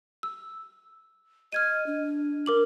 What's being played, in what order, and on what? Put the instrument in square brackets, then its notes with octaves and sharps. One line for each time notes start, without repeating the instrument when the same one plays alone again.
[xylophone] E6
[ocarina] D#5 [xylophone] F6 G#6 D#7
[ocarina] D4
[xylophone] A#4 D6 F#7